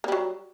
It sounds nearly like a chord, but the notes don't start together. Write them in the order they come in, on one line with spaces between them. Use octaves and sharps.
A#3 G3 F#3